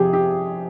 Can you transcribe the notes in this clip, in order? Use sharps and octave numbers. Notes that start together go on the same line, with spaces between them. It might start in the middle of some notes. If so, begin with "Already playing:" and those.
Already playing: F2 C3 F3 G4 G#4
G4